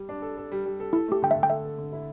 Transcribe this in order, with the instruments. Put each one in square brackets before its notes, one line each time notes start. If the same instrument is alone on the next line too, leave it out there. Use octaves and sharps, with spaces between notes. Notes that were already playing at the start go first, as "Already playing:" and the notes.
Already playing: [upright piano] G3
D4
A4
A4
G3
G3
A4
[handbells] E4 [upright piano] A4
[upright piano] A3 [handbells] G4
[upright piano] D3 [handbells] G5
[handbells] E5
[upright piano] D3
[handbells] G5
[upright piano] A4 [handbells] E5
[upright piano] A4
D3
E4